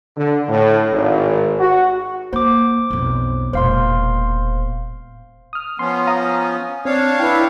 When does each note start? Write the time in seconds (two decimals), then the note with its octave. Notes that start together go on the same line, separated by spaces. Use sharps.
0.16 D3
0.48 A2
0.92 G#1
1.59 F#4
2.33 A#3 C5 D6
2.90 B1 F2
3.53 E1 A#2 C5 F5 C6
5.53 D#6 F6
5.79 F3 B3 C#4 C6
6.07 F5 A#5 D#6
6.85 C4 D4 C#5 F5
7.20 E4 B4 G5